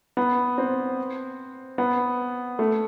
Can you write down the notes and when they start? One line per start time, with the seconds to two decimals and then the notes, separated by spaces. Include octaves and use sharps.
0.17 B3
0.58 C4
1.78 B3
2.59 A3